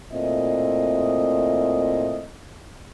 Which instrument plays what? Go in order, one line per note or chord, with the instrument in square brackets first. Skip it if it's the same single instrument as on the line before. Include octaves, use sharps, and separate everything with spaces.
[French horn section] A#2 A3 C4 E4 D#5